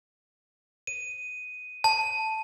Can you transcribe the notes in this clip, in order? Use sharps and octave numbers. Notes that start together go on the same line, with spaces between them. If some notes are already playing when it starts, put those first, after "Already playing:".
D#7
A5